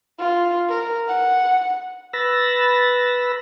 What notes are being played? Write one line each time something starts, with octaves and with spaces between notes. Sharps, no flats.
F4
A#4
F#5
B4 B5 E6 A6 A#6